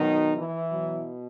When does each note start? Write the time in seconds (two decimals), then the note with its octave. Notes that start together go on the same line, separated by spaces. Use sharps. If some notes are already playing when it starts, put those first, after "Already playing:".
Already playing: B2 D#3 F#3 D#4
0.36 E3 E4
0.71 B2 F#3